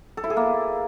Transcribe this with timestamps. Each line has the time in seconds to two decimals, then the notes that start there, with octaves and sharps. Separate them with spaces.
0.17 A4
0.24 E4
0.30 G#4
0.36 A#3